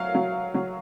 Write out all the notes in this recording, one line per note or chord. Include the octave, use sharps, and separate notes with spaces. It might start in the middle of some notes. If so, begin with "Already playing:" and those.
Already playing: F#3 F5
F#3
F#3